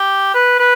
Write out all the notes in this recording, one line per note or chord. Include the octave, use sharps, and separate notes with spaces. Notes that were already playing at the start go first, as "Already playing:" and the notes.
Already playing: G4
B4
B4